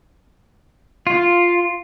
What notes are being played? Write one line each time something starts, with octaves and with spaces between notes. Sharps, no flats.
F4